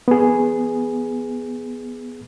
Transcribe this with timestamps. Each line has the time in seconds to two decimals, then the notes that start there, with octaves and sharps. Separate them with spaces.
0.08 B3 G#4